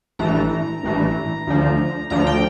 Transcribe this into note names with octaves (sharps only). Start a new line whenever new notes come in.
A1 G2 E3 A3 A#5
A1 G2 E3 A3
D2 D3 F3
D2 D3 F3 A#5
G5